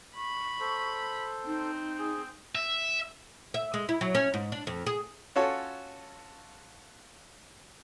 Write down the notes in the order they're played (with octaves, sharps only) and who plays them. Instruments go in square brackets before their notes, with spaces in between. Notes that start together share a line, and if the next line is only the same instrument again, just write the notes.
[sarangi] B5 [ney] C#6
[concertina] A4 C5
[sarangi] C4 [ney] D#4
[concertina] G#4
[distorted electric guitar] E5
[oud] E5
G#3
E4
F#3
C#4
G#2
D4
F2
G#4
[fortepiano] C#4 F4 F#4 A4 C#5